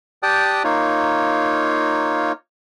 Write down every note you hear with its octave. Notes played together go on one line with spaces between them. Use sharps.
G4 D5 G5 A5 D#6 F#6
A#3 D#4 F4 C#5